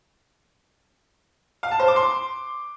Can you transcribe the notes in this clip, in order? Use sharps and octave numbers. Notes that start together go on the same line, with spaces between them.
F5
A5
C5
D6
C6